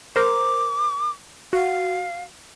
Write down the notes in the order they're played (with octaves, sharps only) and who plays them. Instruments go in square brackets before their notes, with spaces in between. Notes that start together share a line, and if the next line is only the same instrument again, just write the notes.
[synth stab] A#4 C5 [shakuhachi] D6
[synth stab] F#4 [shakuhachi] F5